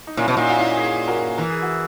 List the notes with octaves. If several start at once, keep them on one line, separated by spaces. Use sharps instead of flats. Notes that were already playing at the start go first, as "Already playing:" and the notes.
D#4
A#2 C#4 E4
B2
A#2 D#4 F#4
F#4
C#4 E4
E4 G#4
F#4 A#4
E3 A#4
G#4
F#4